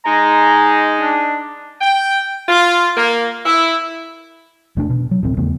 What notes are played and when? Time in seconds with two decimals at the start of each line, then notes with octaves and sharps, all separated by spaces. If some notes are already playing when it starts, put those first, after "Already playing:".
0.05 G#3 D#4 A#5
1.01 D4
1.81 G5
2.48 F4
2.96 A#3
3.44 E4
4.77 E1 A3 D4
4.90 B2
5.11 F#3
5.23 D1 A1 C4
5.37 E2 C#3 A3 B3